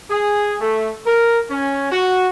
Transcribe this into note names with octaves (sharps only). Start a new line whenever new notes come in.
G#4
A3
A#4
C#4
F#4